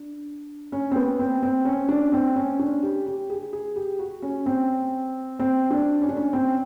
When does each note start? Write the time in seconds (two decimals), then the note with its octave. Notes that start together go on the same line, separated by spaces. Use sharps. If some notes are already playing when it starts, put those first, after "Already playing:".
Already playing: D4
0.72 C#4
0.91 C4
0.96 B3
1.19 C4
1.43 C4
1.65 C#4
1.89 D4
2.12 C4
2.36 C#4
2.59 D4
2.82 G4
3.06 G4
3.30 G#4
3.53 G#4
3.76 G4
3.99 F#4
4.22 C#4
4.46 C4
5.39 C4
5.70 D4
6.02 C#4
6.09 D4
6.17 C#4
6.33 C4